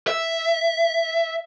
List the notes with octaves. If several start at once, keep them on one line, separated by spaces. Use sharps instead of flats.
E5